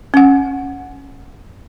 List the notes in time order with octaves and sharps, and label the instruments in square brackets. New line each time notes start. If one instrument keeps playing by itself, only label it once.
[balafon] C#4 F#5